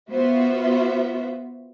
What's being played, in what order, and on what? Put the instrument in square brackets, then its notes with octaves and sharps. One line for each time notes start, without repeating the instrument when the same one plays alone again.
[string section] B3 F4 F#4 C5 E5